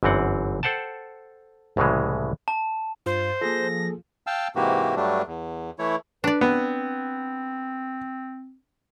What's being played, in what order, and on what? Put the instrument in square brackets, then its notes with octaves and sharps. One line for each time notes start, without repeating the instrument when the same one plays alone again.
[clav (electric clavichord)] G1 F#2 E3 C4 F#5
A4 C5 F#5 G5 A5
C2 A2 C#3 E3 G#3
[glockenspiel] A5
[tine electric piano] G2 [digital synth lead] F4 [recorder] C5
[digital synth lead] F3 [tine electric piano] A#3 G#4 A4 [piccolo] A#6
[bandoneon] F5 G5 A5 E6
G#2 C3 E3 A#3 F#4 G4
G2 F#3 G3 A3 D4
E2
E3 A3 E4 C#5
[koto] D4 D5 [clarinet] B4
[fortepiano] B3 [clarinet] C4